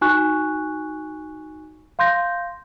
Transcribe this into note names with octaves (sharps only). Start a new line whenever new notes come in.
D#4 F#4 G#5 C#6 F#6
F5 C6 G6 A#6